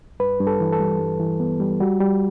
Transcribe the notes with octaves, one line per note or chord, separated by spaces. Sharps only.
G2 B4
G2
A4
E3
A4
G3
G2
E3
B3
G3
G3 F#4
G3